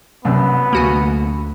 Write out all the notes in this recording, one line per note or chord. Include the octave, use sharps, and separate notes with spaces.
C2 F#2 B3
D2 A#3 F#4 G#5